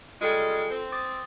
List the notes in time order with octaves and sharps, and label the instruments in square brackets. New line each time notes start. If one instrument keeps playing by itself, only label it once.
[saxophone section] C#3 G3 G#3 [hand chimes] F4 A4 G5
[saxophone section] C4
[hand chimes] D6 D#6 A6